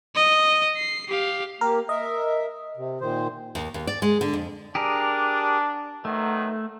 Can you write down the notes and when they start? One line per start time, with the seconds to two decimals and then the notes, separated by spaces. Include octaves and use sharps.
0.16 D#5
0.77 C7
1.08 G4 F5
1.61 A#3 G4 A#4
1.89 A#4 D#5 E5
2.77 C3
3.01 A#2 D#3 C5
3.55 D#2
3.74 D#2
3.87 D5
4.02 G#3
4.21 D3
4.34 F2
4.75 D4 G4 G#4 A#4
6.05 D#3 F#3 A3 B3